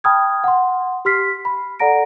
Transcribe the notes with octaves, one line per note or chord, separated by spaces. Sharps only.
G5 A5 B5 D#6 F6 G#6
F#5 C6
G4 C6 F6 B6 C7
B5
A4 D5 F#5 A#5 A#6 D7